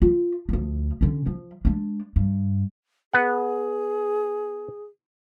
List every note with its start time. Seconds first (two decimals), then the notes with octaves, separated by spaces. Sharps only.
0.02 F4
0.49 D2 F3
1.01 D3 C#4
1.26 F3
1.65 G#3 D4
2.16 G2
3.13 B3 G#4 F#5